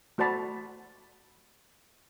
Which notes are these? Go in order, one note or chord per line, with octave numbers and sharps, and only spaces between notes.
A3 F#4 C5 D5 A5 B5